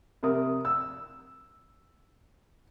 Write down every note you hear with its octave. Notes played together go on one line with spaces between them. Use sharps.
C3 A#4 D#6
E6